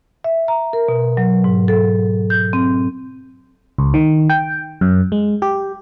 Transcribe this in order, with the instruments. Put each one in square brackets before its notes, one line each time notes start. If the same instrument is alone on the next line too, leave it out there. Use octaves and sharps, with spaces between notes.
[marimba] E5
A#5
A#4
B2
F#3
G#2
A4
G6
C4
[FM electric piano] C#2
D#3
G5
F#2
G#3
G4